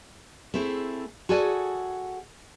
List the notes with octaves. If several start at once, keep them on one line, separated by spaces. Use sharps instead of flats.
A3 C4 E4 G#4
F#4 G#4 A4 D5 G#5